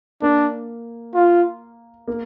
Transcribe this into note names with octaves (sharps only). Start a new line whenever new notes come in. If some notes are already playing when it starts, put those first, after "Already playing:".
A#3 D4
F4
A#3